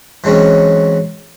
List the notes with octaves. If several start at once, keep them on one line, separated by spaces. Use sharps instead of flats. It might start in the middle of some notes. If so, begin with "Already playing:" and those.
E3 F#3 G#3 C4 C#4